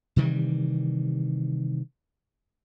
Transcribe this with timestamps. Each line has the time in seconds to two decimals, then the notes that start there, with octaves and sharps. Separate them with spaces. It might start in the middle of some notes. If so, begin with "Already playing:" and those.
0.16 C3 D#3 E3 G3